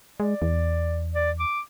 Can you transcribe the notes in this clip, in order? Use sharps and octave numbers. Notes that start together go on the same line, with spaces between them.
G#3 D5
E2
D5
D6